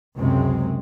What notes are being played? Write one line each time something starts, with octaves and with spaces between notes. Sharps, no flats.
C#2 F#2 C3 G#3 C4